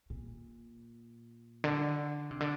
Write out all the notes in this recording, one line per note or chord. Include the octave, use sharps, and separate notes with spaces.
A#2
D3
C3
D3